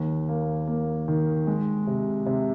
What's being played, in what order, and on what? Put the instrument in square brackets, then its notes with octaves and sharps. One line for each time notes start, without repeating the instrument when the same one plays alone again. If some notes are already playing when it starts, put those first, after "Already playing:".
Already playing: [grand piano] D#2
A#3
A#3
D#3
G#3
C3
C3